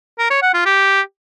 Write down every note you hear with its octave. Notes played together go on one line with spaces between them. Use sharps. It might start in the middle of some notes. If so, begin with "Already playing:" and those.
A#4
C#5
F#5
F4
G4